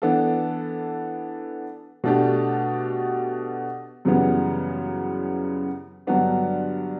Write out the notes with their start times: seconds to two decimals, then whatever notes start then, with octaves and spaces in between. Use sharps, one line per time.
0.02 E3 B3 D4 A4
2.04 B2 A3 D4 G4
4.05 F#2 C#3 E3 G3 B3
6.07 G2 D3 F#3 B3 D4